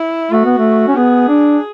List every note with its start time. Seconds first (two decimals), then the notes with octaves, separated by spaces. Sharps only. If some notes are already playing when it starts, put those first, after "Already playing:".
Already playing: E4
0.31 A3 F#4
0.45 B3
0.58 A3
0.88 C#4
0.96 B3 G#4
1.28 D4